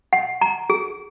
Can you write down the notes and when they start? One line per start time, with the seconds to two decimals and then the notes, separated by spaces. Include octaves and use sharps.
0.13 F#5
0.41 A#5
0.70 G#4